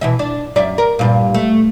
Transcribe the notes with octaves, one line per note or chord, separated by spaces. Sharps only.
B2 E3 E5
D4
F#2 D5 E5
A#4
G2 A#2
A3